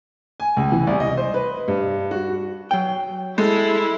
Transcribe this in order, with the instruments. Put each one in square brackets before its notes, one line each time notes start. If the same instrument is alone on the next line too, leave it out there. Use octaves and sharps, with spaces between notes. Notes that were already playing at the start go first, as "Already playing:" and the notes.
[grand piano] G#5
C#2
E3
C2
D#5
C5
B4
G2
F#4
[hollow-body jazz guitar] F#3 G5
[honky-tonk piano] G#3 [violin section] E4 [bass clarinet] A4